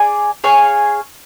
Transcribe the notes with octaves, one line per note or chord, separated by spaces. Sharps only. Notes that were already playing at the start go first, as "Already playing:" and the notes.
Already playing: G#4 D5 G#5
G#4 C#5 F5 G#5